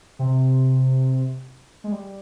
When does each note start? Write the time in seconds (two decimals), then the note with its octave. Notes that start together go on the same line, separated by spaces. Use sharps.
0.19 C3
1.84 G#3
1.92 G3